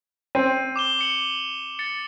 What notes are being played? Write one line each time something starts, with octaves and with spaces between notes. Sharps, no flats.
C4 D#7
D6 E7 G7
D6 C#7 F#7
A6 C#7